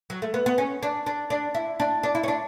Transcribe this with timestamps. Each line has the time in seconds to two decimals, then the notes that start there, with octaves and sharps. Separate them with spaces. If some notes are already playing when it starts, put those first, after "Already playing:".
0.10 F#3
0.22 A3
0.34 B3
0.46 B3
0.58 C#4
0.83 D4
1.06 D4
1.30 D4
1.55 E4
1.80 D4
2.03 D4
2.15 E4
2.23 C#4
2.28 D4